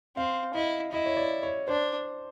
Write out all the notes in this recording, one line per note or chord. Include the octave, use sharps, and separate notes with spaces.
C4 F5
E4 D#5
E4 D#5
C#5
D5
C#5
D4 C5